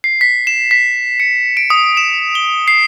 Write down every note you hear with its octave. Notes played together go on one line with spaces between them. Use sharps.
C7
B6
E7
B6
C#7
D7
D#6
E7
G7
C7